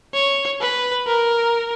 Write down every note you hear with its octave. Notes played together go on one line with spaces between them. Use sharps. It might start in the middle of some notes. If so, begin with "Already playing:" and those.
C#5
B4
A#4